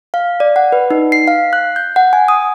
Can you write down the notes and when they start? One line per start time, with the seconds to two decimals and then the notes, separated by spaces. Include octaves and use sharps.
0.14 F5
0.40 D5
0.56 F#5
0.72 B4
0.91 D#4
1.12 C7
1.28 F5
1.53 F#6
1.76 G6
1.96 F#5
2.13 G#5
2.28 D#6